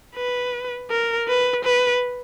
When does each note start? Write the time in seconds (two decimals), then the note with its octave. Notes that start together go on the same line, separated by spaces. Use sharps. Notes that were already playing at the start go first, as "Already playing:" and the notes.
0.16 B4
0.90 A#4
1.28 B4
1.65 B4